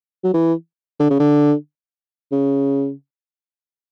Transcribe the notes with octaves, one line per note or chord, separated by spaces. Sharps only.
F#3
E3
D3
C#3
D3
C#3